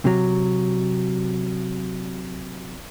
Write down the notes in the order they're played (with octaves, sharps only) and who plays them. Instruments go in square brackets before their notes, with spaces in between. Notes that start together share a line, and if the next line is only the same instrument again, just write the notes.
[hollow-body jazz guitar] C3 F#3